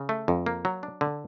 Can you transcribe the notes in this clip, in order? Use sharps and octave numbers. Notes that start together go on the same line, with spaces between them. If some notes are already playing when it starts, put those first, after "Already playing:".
Already playing: C#3
A3
F2
A#3
F#3
D4
D3